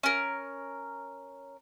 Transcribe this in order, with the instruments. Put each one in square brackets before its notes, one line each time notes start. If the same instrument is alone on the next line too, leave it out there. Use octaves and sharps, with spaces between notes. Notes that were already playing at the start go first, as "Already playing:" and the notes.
[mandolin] C#4 A#4